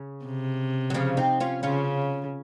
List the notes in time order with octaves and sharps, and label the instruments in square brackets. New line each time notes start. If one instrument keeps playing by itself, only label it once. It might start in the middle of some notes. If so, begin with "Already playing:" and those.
Already playing: [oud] C#3
[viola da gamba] C3
[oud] F#3
C#3 F3
C4 D#4
C#4 F4
[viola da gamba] C#3 [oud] C#4 F4